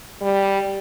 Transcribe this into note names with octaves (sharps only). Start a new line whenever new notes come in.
G3